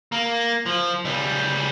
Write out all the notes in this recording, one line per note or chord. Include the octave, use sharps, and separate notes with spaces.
A#3
F3
C#2 G3